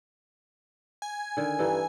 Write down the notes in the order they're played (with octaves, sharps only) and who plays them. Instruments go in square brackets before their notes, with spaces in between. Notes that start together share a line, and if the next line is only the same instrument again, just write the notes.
[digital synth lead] G#5
[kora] D3 D#3
[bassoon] G2 [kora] E3 D#4 A4